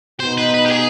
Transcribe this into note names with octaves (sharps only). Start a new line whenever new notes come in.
B2 B3 D#4 C5
B4
B4
G4
G#4